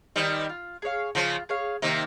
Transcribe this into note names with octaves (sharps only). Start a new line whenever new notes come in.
D#3 G3 C5 D#5 G#5
F4
G#4 C#5 F5
C#3 F3 F4
G#4 C#5 F5
C3 D#3 A#3